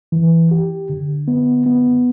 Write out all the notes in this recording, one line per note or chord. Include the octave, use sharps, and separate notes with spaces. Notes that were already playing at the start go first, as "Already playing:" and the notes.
E3
G4
D3
B3
B3